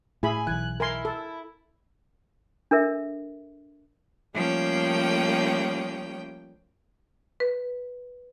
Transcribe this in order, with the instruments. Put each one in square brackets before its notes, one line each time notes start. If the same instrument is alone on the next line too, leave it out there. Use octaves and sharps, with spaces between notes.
[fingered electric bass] A2 [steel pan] E4 G#4 B5 [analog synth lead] G#5
[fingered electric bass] B1 E3 [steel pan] G#5 [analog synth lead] F#6
[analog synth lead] E4 [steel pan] A#4 G#5 C6
[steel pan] A4
[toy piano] D4 A4 A#4 E5
[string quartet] F3 G3 A3 A#3 C#4 G5
[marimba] B4